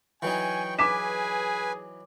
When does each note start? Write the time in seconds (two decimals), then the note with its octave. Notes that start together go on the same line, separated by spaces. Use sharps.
0.22 E3 F#3 D#4 G5 G#5 C#6
0.79 G#4 B4 G#5 D6 B6 E7